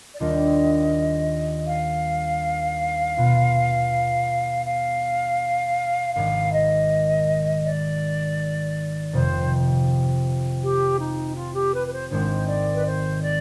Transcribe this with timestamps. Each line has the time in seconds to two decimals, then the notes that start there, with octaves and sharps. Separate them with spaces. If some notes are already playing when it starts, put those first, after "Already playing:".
0.13 D5
0.20 D#2 D#3 G3 D4 F4 D#5
1.68 F5
3.17 B2 B3 F4
4.67 F5
6.15 G#1 G#2 D#3 F5
6.53 D#5
7.64 D5
9.13 F1 F2 C3 C5
10.62 G4
10.99 D#4
11.36 F4
11.55 G4
11.73 B4
11.87 B4
11.93 C5
12.11 G#1 G#2 D#3 G#3 C4 C5
12.48 D5
12.74 B4
12.85 C5
13.23 D5